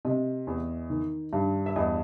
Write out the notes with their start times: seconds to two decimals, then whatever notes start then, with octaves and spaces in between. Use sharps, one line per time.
0.05 C3 D#5
0.47 E2
0.90 D#3
1.33 G2
1.66 E5
1.76 E2 D#5